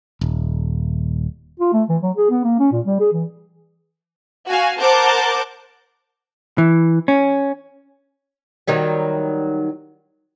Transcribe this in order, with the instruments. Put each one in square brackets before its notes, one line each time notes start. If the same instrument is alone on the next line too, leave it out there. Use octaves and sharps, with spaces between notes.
[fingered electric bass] D#1
[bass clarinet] F4
A3
E3
F#3
G#4
B3
A#3
C#4
A#2
G3
G#4
E3
[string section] F#4 F5 G#5
A#4 C5 F#5 A5 D6 G6
[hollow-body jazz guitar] E3
C#4
[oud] D#3 F#3 G3